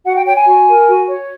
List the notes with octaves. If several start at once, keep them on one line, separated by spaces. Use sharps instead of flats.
F#4 F#5
G5
C#5 G5
G#5
F#4
A#4
F#4
C#5